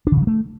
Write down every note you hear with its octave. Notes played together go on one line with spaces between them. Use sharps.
D4
D#3
C#3
F#3
A3